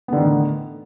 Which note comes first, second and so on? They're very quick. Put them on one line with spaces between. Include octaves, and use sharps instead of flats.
B3 D3 D#3 A2